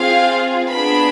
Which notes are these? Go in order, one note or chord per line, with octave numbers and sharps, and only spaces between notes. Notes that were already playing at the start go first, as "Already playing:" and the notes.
Already playing: C4 F4 G#4 F5
B3 D4 G#4 B5